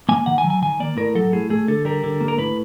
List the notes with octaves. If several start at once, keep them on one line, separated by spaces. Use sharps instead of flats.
A#3 G#5
D#3 F#5
G#5
F#3
G#5
D#3 G#5
A#3 D5
A2 A#4
F#3 A4
A2 G#4
A3 G#4
D3 A4
G3 A#4
D3
A#3
A#4
A2 B4